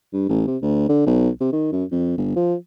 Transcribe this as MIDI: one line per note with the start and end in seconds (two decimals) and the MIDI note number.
0.14 0.25 43
0.29 0.43 33
0.47 0.57 48
0.62 0.89 38
0.89 1.05 50
1.07 1.29 35
1.40 1.50 48
1.53 1.72 51
1.72 1.84 42
1.92 2.16 41
2.17 2.32 31
2.36 2.55 53